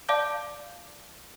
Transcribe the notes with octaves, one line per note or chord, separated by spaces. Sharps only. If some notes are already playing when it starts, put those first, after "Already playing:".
D5 F5 A5 D6 G6